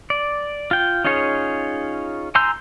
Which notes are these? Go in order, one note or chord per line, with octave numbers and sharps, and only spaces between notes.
D5
F4 G5
C#4 D#4 F4 G#4 C#5
G#5 A#5 C6 E6 G6